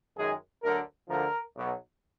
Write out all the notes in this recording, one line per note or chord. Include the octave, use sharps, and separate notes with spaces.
F#2 D#3 G#3 G#4
D2 D3 F#3 A#4
D2 D3 F3 A#4
B1 B2 F#3